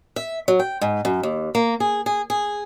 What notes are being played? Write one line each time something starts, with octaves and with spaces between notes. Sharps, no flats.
E5
F#3
G5
G#2
F#2
D#2
A#3
G#4
G#4
G#4